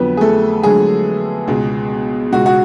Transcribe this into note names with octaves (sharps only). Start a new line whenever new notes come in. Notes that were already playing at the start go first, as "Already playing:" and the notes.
Already playing: F2 D3 F#3 B3 B4
G#4
A3 A4
F2 D3 F#3 G#3 G#4
C#2 B2 G#3
C#2 B2 G#3 F#4
F#4